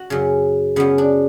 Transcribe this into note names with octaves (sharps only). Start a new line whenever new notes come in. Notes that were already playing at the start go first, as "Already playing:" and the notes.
Already playing: F#4
F#2 C#3
F#2 C#3 B3
D4